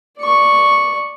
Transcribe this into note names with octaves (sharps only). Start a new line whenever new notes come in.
D5 C#6